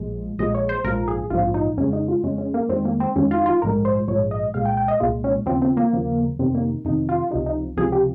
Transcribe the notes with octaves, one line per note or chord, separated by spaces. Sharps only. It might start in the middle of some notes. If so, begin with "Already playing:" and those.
Already playing: A#1 A#2 F3 G#3
A#1 A#2 F3 G#3 D#5
C#5
C5
A#1 G#2 F3 A#4
G#4
A#1 G#2 F3 F4
D#4
F2 C#3 G#3 C#4
D#4
F4
F2 C#3 G#3 C#4
C#4
A#3
F2 D#3 G#3 C4
A#3
C4
F2 D#3 G#3 C#4
F4
F4
A#1 G#2 F3 G#3 A#4
C5
A#1 G#2 F3 G#3 C#5
D#5
C2 A#2 G#3 F5
G5
G5
D#5
C2 A#2 G#3 F4
C#4
D#2 C#3 F3 C4
C4
A#3
D#2 C#3 F3
F2 C3 D#3 C4
A#3
F2 C3 D#3 D#4
F4
C#2 C3 F3 D#4
D#4
C#2 C3 F3 G#4
G4